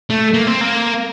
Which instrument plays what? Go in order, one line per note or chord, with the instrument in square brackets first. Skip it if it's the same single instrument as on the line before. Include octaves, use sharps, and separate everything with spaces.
[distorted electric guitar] A3
A#3
C4
A#3